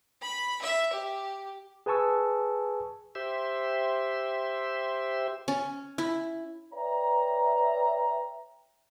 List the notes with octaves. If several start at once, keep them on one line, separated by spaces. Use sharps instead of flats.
B5
E5
G4
G#4 B4 G#5 A5 C#6 E6
G4 C5 E5
C#4
E4
B4 C#5 D5 E5 G5 A#5